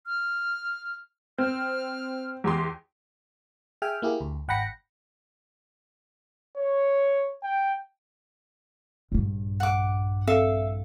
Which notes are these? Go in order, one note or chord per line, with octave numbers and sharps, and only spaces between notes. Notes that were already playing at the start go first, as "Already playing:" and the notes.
F6
C4 F6
E2 G4 C6
G#4 E5 G5 G#5 F6
A#3 E4 G4 G#4
D2
G#1 F#5 G5 B5 A#6 C#7
C#5
G5
A#1 G2
F#5 D6
C4 A4 E5 F5